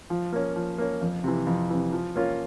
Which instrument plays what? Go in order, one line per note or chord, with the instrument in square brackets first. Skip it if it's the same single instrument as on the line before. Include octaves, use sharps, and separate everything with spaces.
[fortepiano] F3
A#3 C#4
F3
A#3 C#4
F2
C3 E3
F2
C3 E3
F3
A#3 C#4 F4